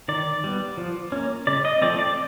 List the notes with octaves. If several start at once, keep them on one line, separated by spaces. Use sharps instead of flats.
D#3 D5
G3 B3
F3
A#3 C#4
C#3 D5
D#5
F3 A3 C4 D5
D5